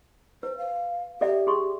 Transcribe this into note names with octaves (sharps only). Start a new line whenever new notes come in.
B4 C5
F5
G4 A4 D5 E5
G#4 C6 C#6